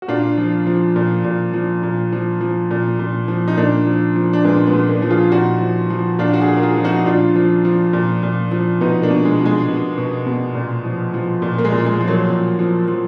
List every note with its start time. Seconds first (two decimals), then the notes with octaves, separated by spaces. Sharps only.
0.02 F#4
0.08 A#2 D4 F4
0.37 F3
0.67 F3
0.96 A#2
1.24 A#2
1.54 F3
1.83 A#2
2.12 F3
2.41 F3
2.71 A#2
2.99 A#2
3.28 F3
3.48 D#4
3.57 A#2 A#3 D4
3.86 F3
4.16 F3
4.33 D4
4.44 A#2 G#3 B3
4.67 G#3 B3
4.73 A#2
4.88 A#3 D4
5.02 F3
5.10 F4 G#4
5.32 A#2 D#4 F#4
5.61 F3
5.90 F3
6.19 A#2 D4 F4
6.33 F#4
6.41 F4 G#4
6.48 A#2
6.56 A#4
6.63 F4 G#4
6.77 F3
6.84 D#4 F#4
7.06 A#2 D4 F4
7.36 F3
7.65 F3
7.93 A#2
8.23 A#2
8.51 F3
8.81 B2 B3 D#4
9.02 A#3 D4
9.10 B2
9.25 G#3
9.40 B2
9.46 G#3
9.68 B2
9.98 B2
10.27 B2
10.55 A#2
10.85 F3
11.14 F3
11.42 A#2
11.58 A#3
11.65 G#3
11.72 A#2
11.86 G#3
12.01 F3
12.07 F#3 A#3
12.30 A#2
12.59 F3
12.88 F3